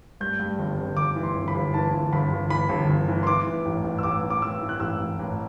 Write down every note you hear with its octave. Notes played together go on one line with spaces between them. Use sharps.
G2 G6
G2
G1
G1
G1 D6
E3
C6
G1
B5
G1
E3 A5
G1
G1 B5
G1
E3 B5
G1
G1
E3
C6
E3 D6
E3
A1
A1
E6
A1 D6
E3
D6
A1 E6
E3
F#6
A1 E6
A1
A1